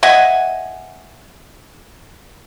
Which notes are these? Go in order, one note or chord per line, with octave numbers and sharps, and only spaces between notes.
D#5 E5 F#5 G#5